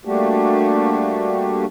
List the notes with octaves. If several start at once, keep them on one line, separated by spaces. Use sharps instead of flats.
G3 A3 A#3 D4 F#4 G4